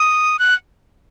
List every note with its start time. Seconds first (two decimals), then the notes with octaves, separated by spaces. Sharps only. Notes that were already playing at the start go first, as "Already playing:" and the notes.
Already playing: D#6
0.39 F#6